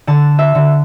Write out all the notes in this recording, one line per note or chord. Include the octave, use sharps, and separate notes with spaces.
D3 A5
E5
D3